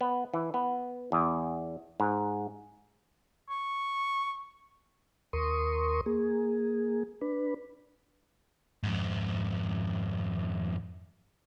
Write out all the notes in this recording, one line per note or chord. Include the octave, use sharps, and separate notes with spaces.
B3
E3
B3
E2
G#2
C#6
D#2 A#4 C6 C#6 D#6
A#3 G#4
D4 B4
F2 G#2